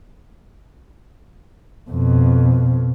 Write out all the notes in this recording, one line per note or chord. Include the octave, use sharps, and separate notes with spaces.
F2 B2